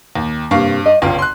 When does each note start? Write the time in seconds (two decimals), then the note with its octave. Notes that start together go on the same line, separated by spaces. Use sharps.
0.15 D#2
0.51 G2 C3 A#3 F5 C#6
0.86 D#5
1.02 G1 C#2 F4 C#5 G5
1.19 C6 F#6